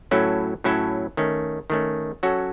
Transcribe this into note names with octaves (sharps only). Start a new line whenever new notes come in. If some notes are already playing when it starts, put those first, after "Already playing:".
A2 F#3 C#4 E4 A4
A2 F#3 C#4 E4 A4
D#3 A3 C#4
D#3 A3 C#4
F#3 C#4 F#4 A4